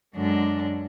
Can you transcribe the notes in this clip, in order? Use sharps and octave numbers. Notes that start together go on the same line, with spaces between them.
F#2 D3 G#3 D4